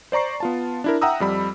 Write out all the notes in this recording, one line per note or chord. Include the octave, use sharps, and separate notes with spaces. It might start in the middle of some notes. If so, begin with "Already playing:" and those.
C5 D5 A#5 C#6 C7
B3 F4 A5
D4 E4 A#4
E5 F#5 G5 A#5 D#6 E6
F2 G3 B5